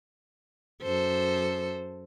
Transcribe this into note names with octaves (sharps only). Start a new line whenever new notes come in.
F#2 A4 C5